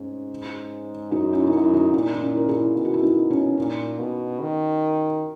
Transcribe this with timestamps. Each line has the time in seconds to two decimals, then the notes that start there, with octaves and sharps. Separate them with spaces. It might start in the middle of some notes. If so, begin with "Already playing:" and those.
Already playing: G#2 C#4
1.11 F#2 D#4 F#4
1.33 C#4 E4
1.47 D#4
1.52 F#2 C#4 E4
1.74 D#4
1.94 A#2 D#4
2.15 D#4
2.21 C#4 E4
2.37 A#4
2.48 E4 G#4
2.76 B2
2.85 F#4
2.94 E4
3.03 D#4
3.31 C#4
3.57 A#2 D#4
3.99 B2
4.40 D#3